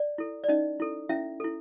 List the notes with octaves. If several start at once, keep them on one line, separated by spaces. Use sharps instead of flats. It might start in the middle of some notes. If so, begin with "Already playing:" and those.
Already playing: D5
E4 A4
D5
C#4 D#4 D#5
E4 A4
C#4 E4 E5
E4 A4